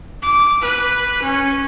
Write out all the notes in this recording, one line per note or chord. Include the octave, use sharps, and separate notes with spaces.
D6
B4
C#4